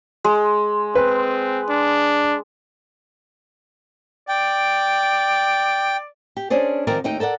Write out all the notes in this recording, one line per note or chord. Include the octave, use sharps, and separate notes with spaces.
G#3
C4 B4
D4
D5 G5
G4
C#4 D4 G#4 C5 D5
D#3 F3 G#3 C4 A#4 D5
D#2 A3 D#4 D#5 G5
A4 A#4 D5 F#5